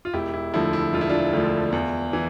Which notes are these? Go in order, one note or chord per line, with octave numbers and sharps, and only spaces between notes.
F4
E1 E4 G4
E4
D2 D3 F3 E4
E4
E1 F4
E4
D4 F4
D2 D3 F3
E2
E3